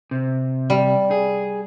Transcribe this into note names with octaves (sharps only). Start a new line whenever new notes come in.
C3
G3
G#4